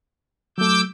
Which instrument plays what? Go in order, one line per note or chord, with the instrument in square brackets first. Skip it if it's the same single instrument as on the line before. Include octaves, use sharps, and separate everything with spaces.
[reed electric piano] F#3 A3 [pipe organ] D6 E6 G6